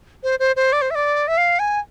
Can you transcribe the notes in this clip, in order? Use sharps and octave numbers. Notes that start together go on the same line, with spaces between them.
C5
C5
C5
D5
C5
E5
D5
E5
F5
G#5